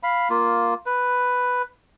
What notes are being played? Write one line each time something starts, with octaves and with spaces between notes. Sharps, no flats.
F5 B5
A#3 F4
B4